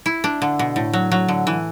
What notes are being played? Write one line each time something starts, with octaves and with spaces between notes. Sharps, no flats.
E4
D4
D3
B2
A2
F#3
F#3
D3
E3